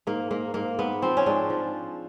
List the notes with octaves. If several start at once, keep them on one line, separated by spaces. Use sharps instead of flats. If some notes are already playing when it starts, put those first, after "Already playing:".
G#2 A#3
G#2 A#3
G#2 A#3
G#2 B3
F3 C4
C#4
G#2 D4
F3